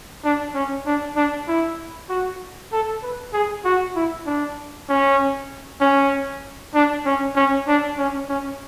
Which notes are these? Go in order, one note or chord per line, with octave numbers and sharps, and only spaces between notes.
D4
C#4
D4
D4
E4
F#4
A4
B4
G#4
F#4
E4
D4
C#4
C#4
D4
C#4
C#4
D4
C#4
C#4